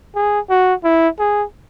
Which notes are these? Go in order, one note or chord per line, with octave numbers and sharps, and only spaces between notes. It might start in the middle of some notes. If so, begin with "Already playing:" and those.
G#4
F#4
E4
G#4